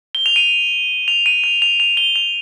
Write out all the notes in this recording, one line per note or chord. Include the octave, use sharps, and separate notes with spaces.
G7
F7
D#7
F7
D#7
F7
F7
F7
G7
F7